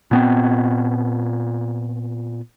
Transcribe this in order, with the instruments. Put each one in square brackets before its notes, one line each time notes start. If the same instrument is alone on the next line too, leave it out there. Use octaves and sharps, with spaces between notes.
[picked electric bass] A#2 B3 C4